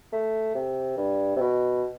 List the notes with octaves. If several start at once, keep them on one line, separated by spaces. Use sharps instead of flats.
A3
C3
G2
C3
B2